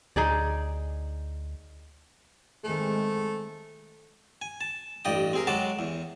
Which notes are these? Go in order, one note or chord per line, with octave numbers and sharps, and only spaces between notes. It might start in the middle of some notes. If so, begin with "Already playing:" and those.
D2 D#4 G#4 D5
D#3 G#3 A3 C4
G#5
A5
A1 G2 D5 D#5 G5 D#6
C4 G#4 A#4
F#3 G#3 F#4 A5 D6
E2